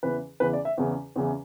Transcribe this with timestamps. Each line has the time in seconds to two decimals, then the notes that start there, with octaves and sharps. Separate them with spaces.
0.03 E2 C#3 E3 B4
0.40 E2 C#3 E3 B4
0.53 D5
0.65 E5
0.78 E2 C#3 E3
1.16 E2 C#3 E3